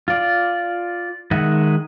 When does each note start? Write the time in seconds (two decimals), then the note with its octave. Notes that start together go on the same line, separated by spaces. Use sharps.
0.08 F4 D5
1.31 D#3 G#3 D#5 E5 F#5